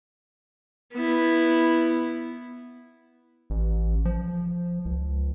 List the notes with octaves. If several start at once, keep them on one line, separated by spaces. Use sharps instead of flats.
B3 E4
A1
F3
C#2